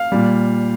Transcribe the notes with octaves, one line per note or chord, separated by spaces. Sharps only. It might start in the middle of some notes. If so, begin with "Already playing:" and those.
Already playing: F5
A#2 G3